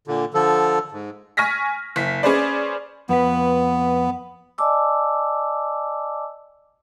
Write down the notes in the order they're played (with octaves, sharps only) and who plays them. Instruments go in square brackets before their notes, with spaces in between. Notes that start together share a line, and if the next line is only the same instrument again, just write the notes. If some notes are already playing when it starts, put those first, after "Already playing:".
[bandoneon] A#2 D3
D3 F3 A4
G#2
[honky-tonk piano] G#5 C#6 F6 A#6 B6
F#1 B6
C#4 G#4 B4 C5 D5
[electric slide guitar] F2 B4 [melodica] B3
[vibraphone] D5 D#5 G#5 A5 D6 E6